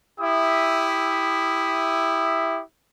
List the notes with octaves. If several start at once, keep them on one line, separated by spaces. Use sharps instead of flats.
E4 G4 E5 D#6